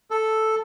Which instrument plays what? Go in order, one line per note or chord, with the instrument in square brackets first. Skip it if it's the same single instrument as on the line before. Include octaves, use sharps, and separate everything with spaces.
[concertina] A4